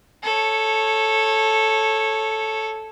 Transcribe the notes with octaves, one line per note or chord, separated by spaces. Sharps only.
A4 C#5